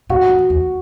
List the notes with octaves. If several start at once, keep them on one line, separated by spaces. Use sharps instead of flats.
A#2 F#4
E2
E2